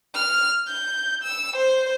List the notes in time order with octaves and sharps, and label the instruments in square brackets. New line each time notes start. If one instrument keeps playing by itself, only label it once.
[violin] F6
G6
E6
C5